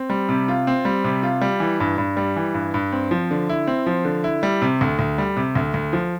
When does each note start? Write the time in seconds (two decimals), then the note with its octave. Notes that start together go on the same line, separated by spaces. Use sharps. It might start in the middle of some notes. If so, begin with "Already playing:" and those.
Already playing: C4
0.10 G3
0.29 C3
0.48 F4
0.67 C4
0.85 G3
1.04 C3
1.23 F4
1.41 G3
1.60 E3
1.80 G2
1.98 G2
2.17 G3
2.36 E3
2.54 G2
2.74 G2
2.92 C4
3.11 F3
3.31 D3
3.49 E4
3.67 C4
3.87 F3
4.05 D3
4.24 E4
4.43 G3
4.62 C3
4.81 D2
4.99 D2
5.18 G3
5.37 C3
5.55 D2
5.74 D2
5.93 F3